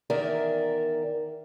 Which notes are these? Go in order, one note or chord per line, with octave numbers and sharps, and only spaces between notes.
E2 D#3 A#4 D5 E5 A#5